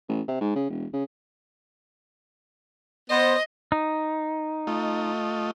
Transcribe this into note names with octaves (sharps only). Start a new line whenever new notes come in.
A1
C3
G#2
C#3
E1
C#3
B3 C5 D#5
D#4
A3 F4 D#5